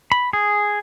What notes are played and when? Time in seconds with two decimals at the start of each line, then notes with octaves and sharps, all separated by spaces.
0.12 B5
0.33 G#4